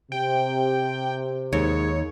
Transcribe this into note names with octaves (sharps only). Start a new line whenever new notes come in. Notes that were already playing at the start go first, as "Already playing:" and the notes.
C3 G5
D#2 G#2 C#5